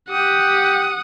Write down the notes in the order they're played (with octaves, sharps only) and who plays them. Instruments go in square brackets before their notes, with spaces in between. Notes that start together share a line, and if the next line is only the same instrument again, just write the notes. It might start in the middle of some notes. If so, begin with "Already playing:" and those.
[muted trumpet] G4 [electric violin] F#5 D#6